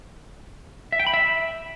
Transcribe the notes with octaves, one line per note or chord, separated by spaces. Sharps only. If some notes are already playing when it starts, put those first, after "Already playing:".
E5
G5
B5
E5